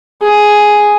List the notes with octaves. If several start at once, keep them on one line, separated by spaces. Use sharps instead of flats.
G#4